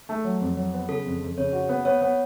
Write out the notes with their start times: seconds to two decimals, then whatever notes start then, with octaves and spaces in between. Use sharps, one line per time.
0.09 A3
0.24 F#3
0.40 F2
0.57 F#3
0.74 B3
0.89 C#3 A4
1.05 F2
1.21 F2
1.38 C#3 C#5
1.53 F#4
1.69 B3
1.85 B3 C#5
2.02 B3